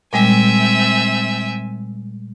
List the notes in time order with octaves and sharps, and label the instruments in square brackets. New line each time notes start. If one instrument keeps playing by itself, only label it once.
[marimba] A#2 G3 G#3 [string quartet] C4 E5 G#5